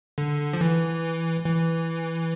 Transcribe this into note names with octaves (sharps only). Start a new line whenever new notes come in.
D3
F3
E3
E3